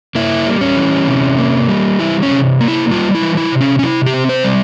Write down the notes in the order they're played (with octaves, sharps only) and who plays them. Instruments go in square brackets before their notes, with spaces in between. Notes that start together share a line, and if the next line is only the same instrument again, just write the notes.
[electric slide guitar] A#3 E4
G3
C#4
E3
C3
A#3
G3
E3 E4
C#4
C3
A#3
E4
G3 F4
E4
E3
E4
C3
C#4
C#4
C3 E4
G4
C4
C5
G3